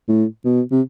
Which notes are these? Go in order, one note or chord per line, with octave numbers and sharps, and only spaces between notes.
A2
B2
C3